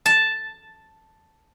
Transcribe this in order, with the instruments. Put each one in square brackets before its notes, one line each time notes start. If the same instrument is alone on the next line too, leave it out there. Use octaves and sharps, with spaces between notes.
[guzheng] A5